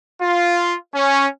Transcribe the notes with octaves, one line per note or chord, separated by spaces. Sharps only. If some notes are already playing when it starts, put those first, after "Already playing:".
F4
C#4